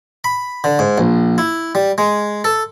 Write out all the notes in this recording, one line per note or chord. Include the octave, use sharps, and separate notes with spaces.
B5
D3
G#2
A#1
E4
G3
G#3
A4